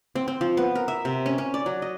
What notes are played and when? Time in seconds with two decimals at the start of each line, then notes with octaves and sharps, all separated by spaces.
0.15 C4
0.28 C4
0.41 F3
0.57 B3
0.75 A#4
0.88 E5
1.05 C3
1.26 C#4
1.38 C#4
1.54 D5
1.66 F#3
1.82 D#5